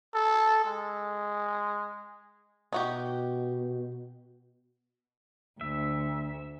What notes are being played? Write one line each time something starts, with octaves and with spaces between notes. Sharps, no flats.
A4
G#3
B2 D#4 F#4 G4
D2 E5